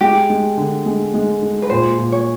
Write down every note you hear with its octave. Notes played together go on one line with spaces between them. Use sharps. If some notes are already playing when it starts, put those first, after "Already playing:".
G#3 G4
G#3
D3
G#3
G#3
G#3
B4
A#2 C5
A#2
C#5